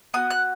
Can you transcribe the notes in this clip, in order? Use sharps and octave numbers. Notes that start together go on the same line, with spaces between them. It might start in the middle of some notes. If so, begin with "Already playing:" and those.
B3 F#4 D#6
F#6